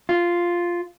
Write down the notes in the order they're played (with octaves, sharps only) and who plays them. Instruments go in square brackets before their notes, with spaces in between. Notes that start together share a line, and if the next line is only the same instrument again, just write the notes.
[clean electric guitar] F4